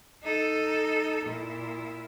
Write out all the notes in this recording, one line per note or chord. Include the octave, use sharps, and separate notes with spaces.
D#4 A4
A#2 E4